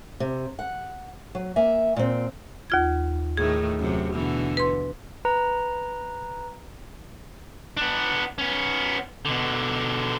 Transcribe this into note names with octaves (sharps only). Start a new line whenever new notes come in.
C3
F#5
F#3
A#3 E5 G#5
A#2 C4
D#2 F4 G#6
A2 D#3 A3 G#4
F#2 C3
B2 D3 E3
B4 C6
B4 A#5
B3 D4
B3 C#4
B2 D3